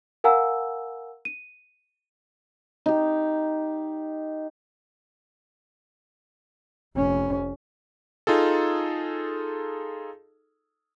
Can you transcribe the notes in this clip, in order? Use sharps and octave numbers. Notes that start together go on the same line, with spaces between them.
A#4 F5 F#5 G#5 A#5 E6
D#7
D#4 G4
F1 C#4
D#4 F4 G#4 A4